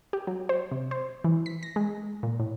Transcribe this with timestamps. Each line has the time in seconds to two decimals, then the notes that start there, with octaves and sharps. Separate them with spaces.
0.13 G4
0.27 F#3
0.49 C5
0.72 C3
0.91 C5
1.24 E3
1.46 B6
1.63 A#6
1.76 G#3
2.23 A#2
2.40 A2